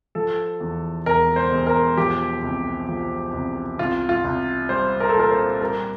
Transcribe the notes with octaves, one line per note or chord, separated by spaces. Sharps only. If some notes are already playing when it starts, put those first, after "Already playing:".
F3 A4
E2
E1 A#4
C5
E1
A#4
F3 G4
C2
F3
C2
C2 F4
F4
C2
G3 C5
A#4
A4
A#2 A#4
C5
G3 A#4